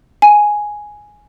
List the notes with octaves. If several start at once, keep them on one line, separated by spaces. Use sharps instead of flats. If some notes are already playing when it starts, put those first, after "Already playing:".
G#5